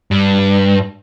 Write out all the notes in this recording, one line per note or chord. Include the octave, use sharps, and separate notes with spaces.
G2